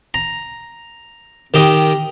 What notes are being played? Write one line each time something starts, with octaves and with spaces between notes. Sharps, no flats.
A#5
D#3 G4 D#5